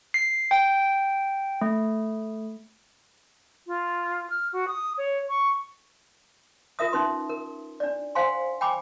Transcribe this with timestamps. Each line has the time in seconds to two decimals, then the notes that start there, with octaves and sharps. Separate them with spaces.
0.14 C7
0.51 G5
1.61 A3
3.67 F4
4.30 F6
4.53 F#4
4.68 D#6
4.98 C#5
5.29 C#6
6.79 F4 A#4 E5 D#6
6.92 C#4 D#4 B4 C6
7.29 A#4
7.80 D4 D5
8.15 C5 F5 F#5 G#5 C6
8.61 G5 G#5 B5 D6